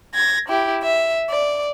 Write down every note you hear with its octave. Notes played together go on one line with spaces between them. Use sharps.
G#6 A#6
E4 G4
E5
D5